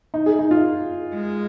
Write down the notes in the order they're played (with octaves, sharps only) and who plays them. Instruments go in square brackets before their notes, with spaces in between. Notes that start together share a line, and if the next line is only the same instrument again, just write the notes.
[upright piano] D#4
G#4
D#4
F4
[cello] G#3